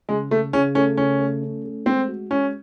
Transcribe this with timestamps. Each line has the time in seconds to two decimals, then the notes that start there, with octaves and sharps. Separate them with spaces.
0.09 C#3 G#3
0.30 C#3 A3
0.53 C#3 C#4
0.75 A3 C#4
0.97 C#3 C#4
1.20 A3
1.42 C#4
1.65 A3
1.86 G#3 C4
2.08 F#4
2.31 G#3 C#4